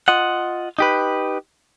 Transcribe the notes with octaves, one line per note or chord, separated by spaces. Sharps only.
F4 D#5 F#5
D#4 G4 B4